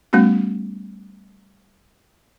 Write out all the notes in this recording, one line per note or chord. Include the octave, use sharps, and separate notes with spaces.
G3 A3 B3 C#4 F#4